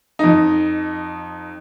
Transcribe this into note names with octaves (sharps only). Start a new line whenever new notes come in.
F2 D#4